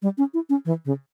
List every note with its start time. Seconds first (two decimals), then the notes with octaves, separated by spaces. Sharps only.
0.02 G3
0.18 C#4
0.34 E4
0.49 C#4
0.65 E3
0.85 C#3